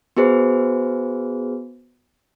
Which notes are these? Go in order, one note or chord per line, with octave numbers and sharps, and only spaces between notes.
B3 F#4 G#4 B4 C5